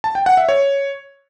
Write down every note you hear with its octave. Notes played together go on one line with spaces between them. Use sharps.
A5
G5
F#5
E5
C#5